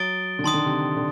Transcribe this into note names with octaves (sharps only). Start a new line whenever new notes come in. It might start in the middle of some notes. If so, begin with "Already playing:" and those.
Already playing: F#3 D#6 A6 D7 G7
D3
D#3 A5 C6 D#6
D3
C3
D3